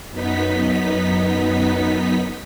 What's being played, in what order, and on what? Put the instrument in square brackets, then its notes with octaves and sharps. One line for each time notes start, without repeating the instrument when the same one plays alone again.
[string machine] F#2 B3 D#4 B6